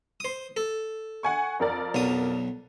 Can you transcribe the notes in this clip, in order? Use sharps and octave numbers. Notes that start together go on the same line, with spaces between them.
C5 D#6
A4
F#5 G#5 C#6
F2 A#4 D5
B1 F#3 D#6